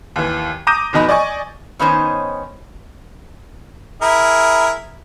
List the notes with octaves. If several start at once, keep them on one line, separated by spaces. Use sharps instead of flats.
D#2 E3
A#5 D6 D#6 G6 A#6 D#7
F1 E2 B2 D#4 B5
D5 D#5 G#5 C#6
D#3 B3 C#4 D#4 C5 C#5
E4 G#4 A#4